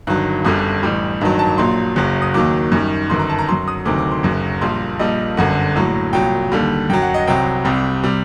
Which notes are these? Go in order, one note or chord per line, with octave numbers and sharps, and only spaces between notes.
G1 G2 D#3 F#3 F#6
G1 F#2 D3 G3 D#6
A1 A2 G3
A1 G2 D#3 F#3
A5
A#1 A#2 F#3 C6
F#1 F#2 F#3
D#6
D#2 D#3 F#3 D6
F#2 D#3 G3
G1 F#2 D#3 C6
A#5
A5
A#5
F#2 F#3 C6
D#6
D2 C3 D#3 F#3 D6
D6
C6
F#1 F#2 F#3
A#1 A#2 G3 C6
A#1 A#2 G3 D#5
G1 F#2 D3 F#5
A#1 A2 F#3
C2 A#2 F#3 G5
D#2 D3 G3
F#2 F#3 G5
F#5
D#5
C2 C3 F#3 G5
C2 C3 G3
C3 G3